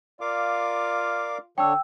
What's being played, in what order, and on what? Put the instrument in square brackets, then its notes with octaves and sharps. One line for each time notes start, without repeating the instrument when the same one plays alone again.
[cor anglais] F4 [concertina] A#4 F5 D6 [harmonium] D5
[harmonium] D3 [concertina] D4 C#5 [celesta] G5 E6